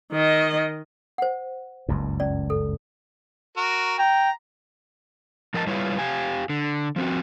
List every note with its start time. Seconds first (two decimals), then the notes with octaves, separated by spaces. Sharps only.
0.13 D#3 D#5
1.18 C5 F#5
1.89 F#1 C#2 G2
2.20 C#4 D5
2.50 A4
3.57 F#4 A#4
3.99 G5 A#5
5.54 F3 A#4 D#5 G5 A5
5.67 G3 E4 F4 B4 C#5
5.99 G4 F5 G#5
6.50 D3
6.96 F3 C4 F#4